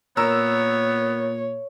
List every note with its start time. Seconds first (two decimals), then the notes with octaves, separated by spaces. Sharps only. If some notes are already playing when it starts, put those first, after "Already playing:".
0.17 A#2 B3 A#4 C#5 A#5 E6